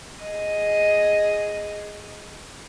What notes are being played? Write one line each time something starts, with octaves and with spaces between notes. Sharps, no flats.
G#4 D#5